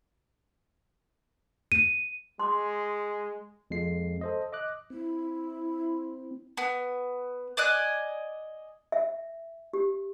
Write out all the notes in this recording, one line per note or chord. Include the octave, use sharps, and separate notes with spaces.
D#7
G#3 C6 D6
F2 G#3 C7
A4 C5 D#5
D#5 D6 F#6
C4 E4
B3
D5 D#5 G#5 F#6
E5
G4